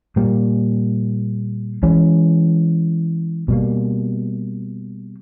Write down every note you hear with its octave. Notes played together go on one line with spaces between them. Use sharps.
A#2 G3 A#3
E3 G#3 C#4
B2 G3 A#3